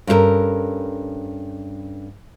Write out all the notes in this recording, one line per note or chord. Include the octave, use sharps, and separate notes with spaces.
G2 C#4 D4 E4 A4 A#4